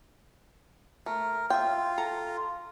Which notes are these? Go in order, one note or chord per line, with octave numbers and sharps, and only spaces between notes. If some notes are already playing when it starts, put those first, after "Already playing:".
A3 A#4
F4 E5 G5
A4 A#5